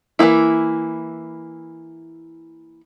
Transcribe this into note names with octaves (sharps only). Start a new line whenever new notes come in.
E3 F3 A#3 E4